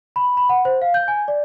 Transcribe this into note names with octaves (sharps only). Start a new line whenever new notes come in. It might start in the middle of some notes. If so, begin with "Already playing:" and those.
B5
B5
F#5
C5
F5
G6
G#5
D5